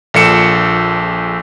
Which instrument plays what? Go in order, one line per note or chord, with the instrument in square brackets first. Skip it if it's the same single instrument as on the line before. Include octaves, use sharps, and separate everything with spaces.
[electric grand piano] A#1 A#2 A4 D5 C#7 E7